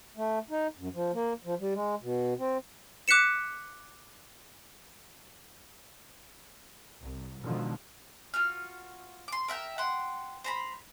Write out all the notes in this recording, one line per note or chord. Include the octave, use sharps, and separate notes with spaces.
A3
D#4
F#2
F3
A#3
F3
G3
G#3
B2
C4
D6 F#6 B6 C#7 E7
C2
B2 D3 D#3 F3 G#3
F4 F#4 F6
C6 D6
A#4 E5 F#5 G5
F#5 G5 C6
C5 A#5 B5